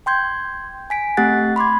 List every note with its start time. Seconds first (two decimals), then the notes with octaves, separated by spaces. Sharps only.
0.06 G5 C6 G6 G#6
0.90 G#5 B6 D7
1.17 A3 C4 G4 F#5 F#6 A6
1.56 B5 C6 D6 G#6